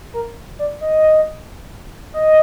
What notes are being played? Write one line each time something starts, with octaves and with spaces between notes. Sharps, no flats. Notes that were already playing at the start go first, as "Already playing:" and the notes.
A#4
D5
D#5
D#5